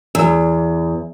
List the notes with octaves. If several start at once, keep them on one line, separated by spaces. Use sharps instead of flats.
E2